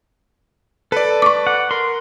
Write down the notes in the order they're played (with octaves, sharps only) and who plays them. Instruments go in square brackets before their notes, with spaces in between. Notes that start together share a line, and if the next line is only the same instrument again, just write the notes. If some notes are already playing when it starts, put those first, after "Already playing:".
[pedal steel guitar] A4 [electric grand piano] B4 D5
[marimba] C#6 D6
[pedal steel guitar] F#5
[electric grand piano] A#4 [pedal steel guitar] C6